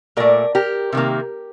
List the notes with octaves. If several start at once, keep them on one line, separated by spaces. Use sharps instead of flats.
A#2 A3 A#4 D5
G4 A#4
C3 D#3 A#3